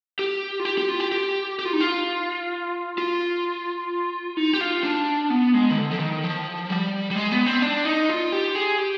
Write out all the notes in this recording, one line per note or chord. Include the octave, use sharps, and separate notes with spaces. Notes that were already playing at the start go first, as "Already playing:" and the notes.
G4
F4
G4
G4
F4
G4
G4
G4
F4
D#4
F4
F4
D#4
G4
F4
D4
B3
G#3
D#3
D3
F3
D#3
F3
G3
G3
G#3
B3
C4
D4
D#4
F4
G4
G#4
G4